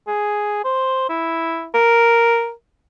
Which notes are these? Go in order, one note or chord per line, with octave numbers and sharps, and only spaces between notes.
G#4
C5
E4
A#4